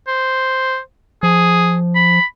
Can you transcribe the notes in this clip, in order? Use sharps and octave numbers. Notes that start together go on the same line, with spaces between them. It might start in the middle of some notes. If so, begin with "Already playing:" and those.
C5
F3 G#4
B5